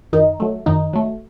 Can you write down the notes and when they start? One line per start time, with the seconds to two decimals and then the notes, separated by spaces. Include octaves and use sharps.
0.13 F#2 D#3 D#4
0.40 F#3 A3
0.66 F#2 D#3 D#4
0.93 F#3 A3